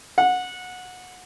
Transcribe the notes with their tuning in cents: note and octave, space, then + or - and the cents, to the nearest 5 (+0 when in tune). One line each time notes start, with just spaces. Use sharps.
F#5 -20